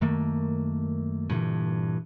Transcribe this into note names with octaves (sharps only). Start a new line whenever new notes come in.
F#2 D#3 A3 A#3
G2 A#2 D3 E3